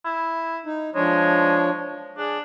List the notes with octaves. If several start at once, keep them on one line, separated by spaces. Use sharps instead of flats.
E4
D#4
F3 G#3 D4 C#5
D4 G#4